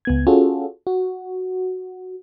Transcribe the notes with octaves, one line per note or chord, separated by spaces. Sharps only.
C#2 B3 G#6
C#4 F4 F#4 G#4 A4
F#4